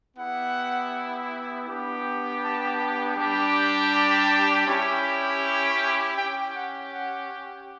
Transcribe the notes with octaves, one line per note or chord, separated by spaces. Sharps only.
B3 E4 G4 F#5
B3 D4 G4
A5
G3 D4 G4
A5
C#4 E4 G4
C#4 G4 G5
F#5
F#5